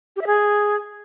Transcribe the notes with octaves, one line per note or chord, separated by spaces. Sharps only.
G4
E5
G#4